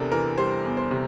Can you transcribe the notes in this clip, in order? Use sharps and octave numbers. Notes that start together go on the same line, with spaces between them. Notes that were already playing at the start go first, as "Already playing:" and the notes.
Already playing: E2 C3 D4 A4 A#4
E3 A#4
G3 C5
E2
C5
C3